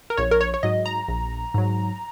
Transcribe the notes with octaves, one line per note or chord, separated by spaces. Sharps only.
A#4
A#1 C#5
A#4
C#5
C#5
G#2 F#3 D#5
A#5
A#1
G#2 F#3